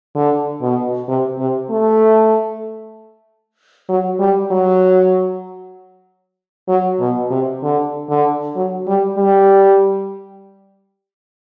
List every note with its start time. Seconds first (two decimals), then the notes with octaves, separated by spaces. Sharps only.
0.15 D3
0.62 B2
1.08 C3
1.39 C3
1.70 A3
3.89 F#3
4.19 G3
4.51 F#3
6.68 F#3
7.00 B2
7.30 C3
7.63 D3
8.09 D3
8.56 F#3
8.87 G3
9.17 G3